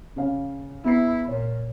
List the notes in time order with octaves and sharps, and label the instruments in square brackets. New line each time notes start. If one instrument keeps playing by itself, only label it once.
[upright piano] C#3 C#4 F5
[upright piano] E2 C7 [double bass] E4
[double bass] A#2 [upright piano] C#5